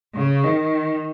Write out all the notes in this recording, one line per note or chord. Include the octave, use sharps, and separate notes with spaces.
C#3
D#3